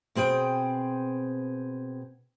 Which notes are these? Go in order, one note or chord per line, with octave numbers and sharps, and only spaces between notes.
B2 C4 G#4 A#4 G5